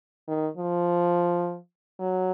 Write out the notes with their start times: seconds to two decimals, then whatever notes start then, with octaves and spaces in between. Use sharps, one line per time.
0.28 D#3
0.57 F3
2.00 F#3